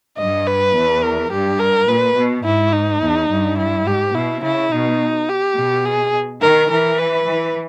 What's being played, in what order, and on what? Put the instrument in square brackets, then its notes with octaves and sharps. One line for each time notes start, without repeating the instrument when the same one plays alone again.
[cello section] G2 [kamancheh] D#5
[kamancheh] B4
[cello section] E2
[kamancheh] A#4
[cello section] G2 [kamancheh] G4
[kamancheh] A#4
[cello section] A#2 [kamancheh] B4
[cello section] B2
[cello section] G#2 [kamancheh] E4
[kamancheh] D#4
[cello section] E2
G2
[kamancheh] E4
[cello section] G#2 [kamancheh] G4
[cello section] B2 [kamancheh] E4
[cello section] C#3 [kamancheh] E4
[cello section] B2 [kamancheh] D#4
[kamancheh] G4
[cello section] B2
[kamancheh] G#4
[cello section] D#3 [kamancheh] A#4
[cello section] E3 [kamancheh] A#4
[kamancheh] B4
[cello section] E3